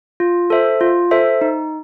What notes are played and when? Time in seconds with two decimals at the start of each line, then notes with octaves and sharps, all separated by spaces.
0.20 F4
0.50 A4 C5 E5
0.81 F4
1.11 A4 C5 E5
1.41 D#4